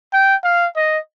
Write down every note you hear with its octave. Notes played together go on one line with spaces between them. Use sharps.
G5
F5
D#5